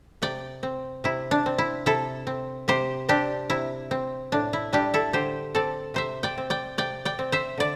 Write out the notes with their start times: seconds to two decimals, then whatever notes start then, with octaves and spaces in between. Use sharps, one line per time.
0.22 C3 D5 G5
0.63 C4
1.04 C3 E4
1.31 D4
1.46 C4
1.58 E4
1.86 C3 E4 A4
2.27 C4
2.68 C3 G4 C5
3.09 C4 D4 G4
3.50 C3 E4
3.91 C4
4.32 A2 D4
4.53 E4
4.73 G3 D4 G4
4.94 E4 A4
5.13 D3 G4 C5
5.55 C4 A4 D5
5.94 C3 C5 E5
6.23 D5 G5
6.38 C4
6.50 D5 G5
6.78 C3 D5 G5
7.05 D5 G5
7.19 C4
7.32 C5 E5
7.58 D3 D5